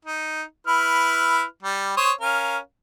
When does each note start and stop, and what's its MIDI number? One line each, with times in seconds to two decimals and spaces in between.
0.05 0.43 63
0.67 1.43 64
0.67 1.43 71
0.67 1.43 89
1.63 1.96 55
1.97 2.12 72
1.97 2.12 73
1.97 2.12 87
2.21 2.58 61
2.21 2.58 70
2.21 2.58 77